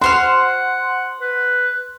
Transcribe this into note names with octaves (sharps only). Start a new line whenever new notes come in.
F#4 C5 F#5 C6 F6
B4